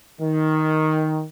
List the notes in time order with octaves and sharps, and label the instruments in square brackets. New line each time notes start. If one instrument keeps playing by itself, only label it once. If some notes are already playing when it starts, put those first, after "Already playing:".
[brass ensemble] D#3